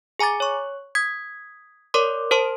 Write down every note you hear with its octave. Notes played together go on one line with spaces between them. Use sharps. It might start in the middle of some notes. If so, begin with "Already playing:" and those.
G#4 G#5 A#5 D6 A6
C#5 C#6
D#6 G#6 B6
A#4 C#5 D5 C6 D6
A#4 C5 A5 C6